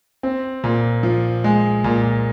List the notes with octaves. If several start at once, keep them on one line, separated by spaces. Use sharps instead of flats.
C4
A#2
F3
G#3
A#2